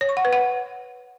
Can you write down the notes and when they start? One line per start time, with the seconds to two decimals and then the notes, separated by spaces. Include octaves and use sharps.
0.01 C#5
0.09 C#6
0.17 F#5
0.25 B4
0.33 F#5